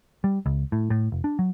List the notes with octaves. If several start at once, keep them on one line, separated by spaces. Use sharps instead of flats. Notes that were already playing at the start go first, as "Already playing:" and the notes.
G3
C#2
A2
A2
F1
D4
F#3